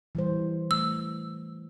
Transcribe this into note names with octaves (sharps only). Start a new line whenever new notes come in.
E3 G3 C5
A3 E6